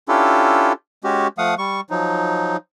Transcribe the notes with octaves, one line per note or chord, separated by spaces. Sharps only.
C#4 D4 E4 F4 G4 A4
G#3 C#4 F#4 G4
F3 A3 F5 F#5 D#6
G3 C#6
F3 F#3 D#4